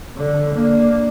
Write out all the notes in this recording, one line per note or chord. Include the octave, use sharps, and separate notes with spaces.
D3
A#3 D4